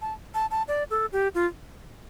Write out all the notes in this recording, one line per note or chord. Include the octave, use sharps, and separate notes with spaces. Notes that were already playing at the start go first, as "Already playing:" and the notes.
A5
A5
A5
D5
A4
G4
F4